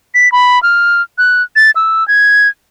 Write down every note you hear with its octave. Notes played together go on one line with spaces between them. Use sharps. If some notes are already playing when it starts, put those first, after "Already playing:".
B6
B5
F6
F#6
A6
E6
G#6